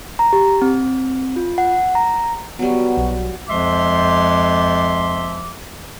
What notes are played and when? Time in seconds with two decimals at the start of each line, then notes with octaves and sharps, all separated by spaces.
0.19 A#5
0.33 G4
0.62 C4
1.36 F4
1.58 F#5
1.95 A#5
2.59 F#3 G3 B3 F#4
2.97 B1
3.49 F2 F3 G#3 E5 C6 D6